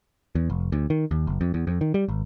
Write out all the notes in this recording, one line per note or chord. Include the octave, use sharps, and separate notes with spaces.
E2
F1
D2
D#3
D#2
F#1
F2
E2
F2
D#3
G3
G#1